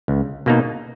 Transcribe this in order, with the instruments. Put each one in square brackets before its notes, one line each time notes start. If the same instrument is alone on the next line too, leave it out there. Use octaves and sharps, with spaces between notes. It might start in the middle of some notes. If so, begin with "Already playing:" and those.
[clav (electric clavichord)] C#2
B2 A#3 D#4